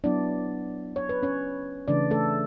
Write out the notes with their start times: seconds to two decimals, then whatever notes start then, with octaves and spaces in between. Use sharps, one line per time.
0.04 F#3 B3 D4 E4 D5
0.96 C#5
1.09 B4
1.23 C#4 C#5
1.88 C#3 E3 A3 D4 D5
2.11 A3 A4